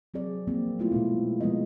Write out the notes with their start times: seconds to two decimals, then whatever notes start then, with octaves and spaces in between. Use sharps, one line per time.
0.14 F#3 C4 G#4 D5
0.47 F3 A#3 C4
0.79 A3 B3 E4 F4
0.92 B2 G#3 B3
1.41 F3 G#3 B3 B4 D#5